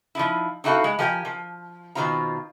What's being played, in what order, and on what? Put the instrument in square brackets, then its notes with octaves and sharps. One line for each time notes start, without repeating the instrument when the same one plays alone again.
[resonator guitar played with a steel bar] F3 D#4 E4
C4 D#4 E4 F#4 A4 F5
G#3
F3 G4 A#4 C#5 G#5
F3
B2 D#3 C4 F4 A#5